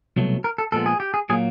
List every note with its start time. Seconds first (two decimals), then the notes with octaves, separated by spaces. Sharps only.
0.16 C2 B2 F#3 A3
0.44 A#4
0.58 A4
0.72 A#2 F3 G#3 B3 A4
0.86 G#4
1.00 G4
1.14 G#4
1.29 A#2 F#3 A#3 G#4